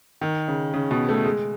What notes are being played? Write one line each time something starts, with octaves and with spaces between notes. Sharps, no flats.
D#3
C#3
C#3
B2
A3
G#3